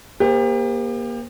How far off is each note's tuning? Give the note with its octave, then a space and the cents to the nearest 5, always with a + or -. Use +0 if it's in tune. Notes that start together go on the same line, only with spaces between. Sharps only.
A#3 +25 G4 +35 C5 +0